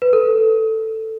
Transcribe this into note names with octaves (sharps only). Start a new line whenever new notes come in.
B4
A4